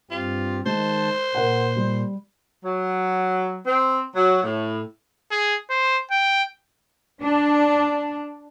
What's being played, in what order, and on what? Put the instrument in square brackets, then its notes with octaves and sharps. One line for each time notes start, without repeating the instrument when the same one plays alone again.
[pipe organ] G2 C4 G4 [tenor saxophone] F4
[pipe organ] D#3 A5 [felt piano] G#3 [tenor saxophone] C5
[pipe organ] A#2 [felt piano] A#4 F#5
[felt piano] G3
[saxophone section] F#3
C4
F#3
A2
[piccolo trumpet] G#4
C5
G5
[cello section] D4